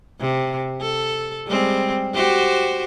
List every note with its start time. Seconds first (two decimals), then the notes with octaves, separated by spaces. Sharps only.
0.20 C3
0.81 A4
1.47 G3 G#3 C4
2.15 F#4 G4 C5